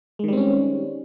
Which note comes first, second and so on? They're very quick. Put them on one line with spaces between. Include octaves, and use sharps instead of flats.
G#3 D#3 G3 C4 C#4